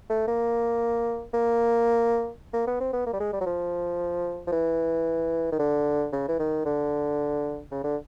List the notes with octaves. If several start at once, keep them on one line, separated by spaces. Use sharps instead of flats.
A3
A#3
A#3
A#3
B3
C4
B3
A#3
G3
G#3
G3
F#3
F3
F3
E3
D#3
D3
C#3
E3
D#3
D3
C#3
D3